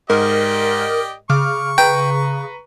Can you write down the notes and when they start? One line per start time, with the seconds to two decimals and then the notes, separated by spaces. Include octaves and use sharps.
0.10 G#2 G4 A#4 D5 D#5
1.30 C#3 C#6 D6 F6
1.78 B4 G5 A#5